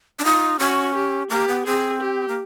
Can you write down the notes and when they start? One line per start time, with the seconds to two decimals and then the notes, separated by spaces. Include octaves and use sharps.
0.19 D4
0.25 D#4 F4
0.59 C#4 F#4
0.95 G4
1.30 A#3 G4
1.48 B3
1.66 C4 G#4
2.01 G4
2.28 A#3